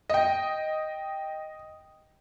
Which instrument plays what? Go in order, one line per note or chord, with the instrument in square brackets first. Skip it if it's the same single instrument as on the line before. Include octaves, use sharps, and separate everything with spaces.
[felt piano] D#5 G5